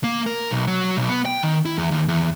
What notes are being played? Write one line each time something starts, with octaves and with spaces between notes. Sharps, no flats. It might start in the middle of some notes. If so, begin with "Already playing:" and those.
A#3
A#4
B1
F#3
B1
B3
G5
D#3
E4
E2
D#2
E2